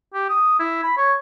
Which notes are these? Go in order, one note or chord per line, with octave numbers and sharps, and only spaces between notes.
G4
D#6
E4
B5
C#5